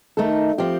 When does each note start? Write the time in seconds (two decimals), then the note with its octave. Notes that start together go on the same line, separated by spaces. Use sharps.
0.17 D#3 A3 D#4 A4
0.58 F3 C4 G4